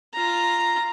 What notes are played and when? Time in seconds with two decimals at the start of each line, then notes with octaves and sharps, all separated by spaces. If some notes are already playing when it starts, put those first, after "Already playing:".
0.13 F4 A#5